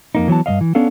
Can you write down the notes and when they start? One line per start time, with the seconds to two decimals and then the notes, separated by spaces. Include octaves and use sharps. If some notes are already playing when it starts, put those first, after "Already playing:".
0.15 F2 A#3 D#4
0.28 E3 F#3 B3 A5
0.46 G2 B2 D#5 F5
0.61 E3
0.75 B3 C#4 D4 A4 F5